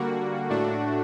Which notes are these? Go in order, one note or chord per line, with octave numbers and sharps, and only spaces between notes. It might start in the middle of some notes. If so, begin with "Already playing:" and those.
Already playing: D3 G3 A#3 F#4
A2 A3 D4 F#4